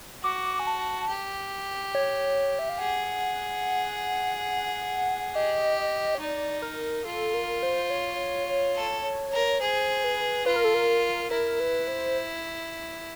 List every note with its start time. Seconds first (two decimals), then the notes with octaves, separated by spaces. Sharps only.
0.24 F#4 D6
0.59 G#5
0.67 A5
1.09 G4
1.95 C#5
2.59 E5
2.69 F5
2.79 G#4 F#5
5.35 G4 D#5
6.15 C#5
6.20 D#4 D5
6.62 A#4
7.05 F4 A4
7.34 A#4
7.63 C5
7.90 C#5
8.76 A4
9.32 A#4
9.60 G#4 C5
10.04 B4
10.46 F4 B4
10.56 A#4
10.64 A4
10.74 A#4
11.31 E4 A#4
11.60 B4
11.88 C5